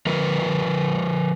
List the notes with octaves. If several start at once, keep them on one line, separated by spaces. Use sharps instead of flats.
F3 A#4 B4